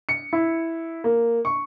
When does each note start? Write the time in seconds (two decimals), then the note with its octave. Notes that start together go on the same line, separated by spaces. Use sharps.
0.09 C#7
0.33 E4
1.04 A#3
1.45 C#6